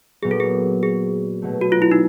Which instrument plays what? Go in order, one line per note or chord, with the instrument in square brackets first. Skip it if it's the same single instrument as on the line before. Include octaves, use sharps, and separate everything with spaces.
[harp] A#2 F#3 B3 [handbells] G#4
[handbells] A4
G#4
G#4
[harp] B2 F#3 A3
[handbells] F#4
F4
E4
D#4